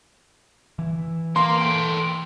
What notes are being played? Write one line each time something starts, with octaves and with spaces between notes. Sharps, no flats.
E3
A#3 C6
A3 G5